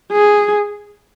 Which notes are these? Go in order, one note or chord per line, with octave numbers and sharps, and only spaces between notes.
G#4